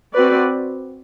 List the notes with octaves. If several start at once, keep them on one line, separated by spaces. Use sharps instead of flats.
C4 F#4 B4 D5